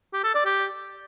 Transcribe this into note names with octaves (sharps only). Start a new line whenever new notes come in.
G4
A4
D5
G4